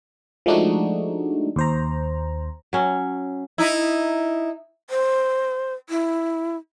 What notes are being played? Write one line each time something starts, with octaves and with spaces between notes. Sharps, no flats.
F3 G#3 A3 D4 D#4 F#4
D#2 C5 A#5
F#3 C#4
D#4 E4
C5
E4